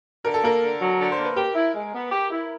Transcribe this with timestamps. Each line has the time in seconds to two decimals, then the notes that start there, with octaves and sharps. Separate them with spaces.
0.24 D3 A#4
0.34 A4
0.42 A#3 A#4
0.62 D3
0.80 F#3
0.99 D3
1.12 C5
1.18 A#3
1.24 B4
1.37 G4 A#4
1.55 E4
1.74 G#3
1.93 B3
2.11 G4
2.31 E4